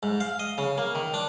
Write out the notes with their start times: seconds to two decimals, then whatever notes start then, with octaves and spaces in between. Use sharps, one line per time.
0.03 G#2
0.20 F5
0.39 D#5
0.58 C#3
0.78 A#3
0.95 D#3
1.14 D4